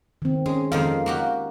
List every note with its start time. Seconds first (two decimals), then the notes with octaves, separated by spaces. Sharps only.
0.22 D#3 C4
0.46 G#3 C#4
0.72 F2 D#3 G#3 A#3 D#5 F5
1.06 A#3 F#4 G4